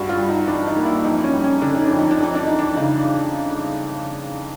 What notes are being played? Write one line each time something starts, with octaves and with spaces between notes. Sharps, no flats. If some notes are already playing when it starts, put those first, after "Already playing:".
Already playing: G2 F#4
F4
G3
D#4
E3 D4
D#4
A#3
E4
F2 D#4
C#4
G3
C#4
D3 D4
D#4
F2 D4
D#4
D4
F2 D#4
D4
E3 D#4
D4
C#3 D#4